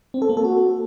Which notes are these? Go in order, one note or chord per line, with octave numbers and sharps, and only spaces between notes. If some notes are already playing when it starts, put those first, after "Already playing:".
C4
A4
A#3
A4
F#4